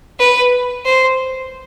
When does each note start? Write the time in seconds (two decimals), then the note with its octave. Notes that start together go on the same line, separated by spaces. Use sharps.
0.20 B4
0.85 C5